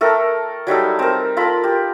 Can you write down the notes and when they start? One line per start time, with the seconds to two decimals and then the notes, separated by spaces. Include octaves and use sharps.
0.01 A3 A4 A#4 G5
0.67 F#3 G3 D#4 A4
0.99 C4 A#4
1.37 F4 A4 A#4 B5
1.64 G4